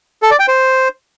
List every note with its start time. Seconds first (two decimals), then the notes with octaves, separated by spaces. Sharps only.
0.22 A4
0.31 D5
0.39 G5
0.48 C5